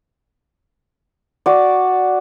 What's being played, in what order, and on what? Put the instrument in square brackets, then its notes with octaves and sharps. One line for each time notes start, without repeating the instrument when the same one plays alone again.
[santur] F#4 D5